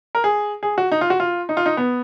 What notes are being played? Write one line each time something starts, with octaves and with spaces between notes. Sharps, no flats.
A#4
G#4
G#4
F#4
D#4
F4
F#4
F4
D#4
F4
D#4
B3